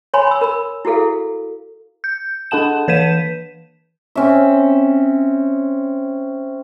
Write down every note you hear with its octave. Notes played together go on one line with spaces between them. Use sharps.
C#5 G#5 B5 C6
B5 E6
A#4 B5
E4 F#4 G#4 A4 F5
G6
D4 A4 F#5 A5 E7
E3 B4 G6 B6 D#7 E7
C4 C#4 E5